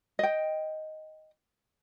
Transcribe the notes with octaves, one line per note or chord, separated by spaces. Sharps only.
D#5 G5